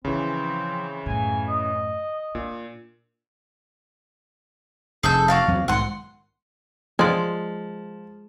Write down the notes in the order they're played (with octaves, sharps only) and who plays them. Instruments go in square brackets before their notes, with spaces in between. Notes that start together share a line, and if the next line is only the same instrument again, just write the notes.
[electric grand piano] C#3 E3 [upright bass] F3 [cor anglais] C4
[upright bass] F#2 A2 [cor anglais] G#5
[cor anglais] D#5
[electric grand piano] A#2 [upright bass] D4
[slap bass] F1 [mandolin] G#4 A4 G6
[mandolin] F#4 D5 F5
[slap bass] E2 F#3 C4
[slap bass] B1 G#2 D#3 [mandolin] F#5 C6
[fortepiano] F3 [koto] G#3 D5